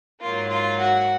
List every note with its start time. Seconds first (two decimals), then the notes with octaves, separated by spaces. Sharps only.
0.21 G#2 F#3 A#3 F4
0.51 F4
0.80 F#4